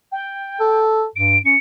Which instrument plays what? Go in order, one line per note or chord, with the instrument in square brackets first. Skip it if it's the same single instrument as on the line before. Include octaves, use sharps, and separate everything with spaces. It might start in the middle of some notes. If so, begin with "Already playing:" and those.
[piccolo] G5
[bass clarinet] A4
[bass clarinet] G2 [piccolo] D7
[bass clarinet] C#4 [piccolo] C#7